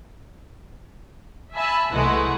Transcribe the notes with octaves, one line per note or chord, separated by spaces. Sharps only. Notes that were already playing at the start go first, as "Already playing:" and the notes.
E5 G#5 A5 B5
C2 E3 G#3 A3 F#5